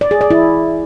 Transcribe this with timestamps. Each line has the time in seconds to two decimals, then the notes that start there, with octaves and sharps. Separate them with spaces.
0.01 D5
0.11 G#4
0.21 D5
0.31 E4